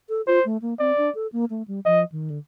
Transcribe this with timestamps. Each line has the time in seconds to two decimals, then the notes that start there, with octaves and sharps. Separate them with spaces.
0.09 A4
0.27 F4 C5
0.45 A3
0.62 A#3
0.80 C4 D5
0.97 D4
1.15 A4
1.33 A#3
1.50 A3
1.68 G3
1.86 F3 D#5
2.12 D#3
2.30 D3